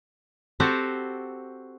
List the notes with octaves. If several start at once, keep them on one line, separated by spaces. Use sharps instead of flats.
C4 F#4 G4 A4 C5